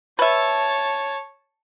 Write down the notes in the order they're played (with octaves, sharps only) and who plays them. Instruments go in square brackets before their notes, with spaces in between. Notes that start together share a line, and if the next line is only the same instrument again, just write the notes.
[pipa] B4 E5 [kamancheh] C#5 A5